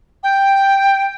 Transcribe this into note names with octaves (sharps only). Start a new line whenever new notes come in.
G5